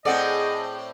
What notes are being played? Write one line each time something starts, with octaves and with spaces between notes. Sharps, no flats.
A2 C4 G#4 A4 D5 D#5 F#5